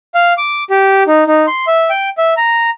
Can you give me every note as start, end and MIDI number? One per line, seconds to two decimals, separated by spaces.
0.15 0.33 77
0.38 0.63 86
0.70 1.03 67
1.07 1.24 63
1.27 1.46 63
1.47 1.65 84
1.67 1.90 76
1.90 2.09 79
2.18 2.34 76
2.37 2.70 82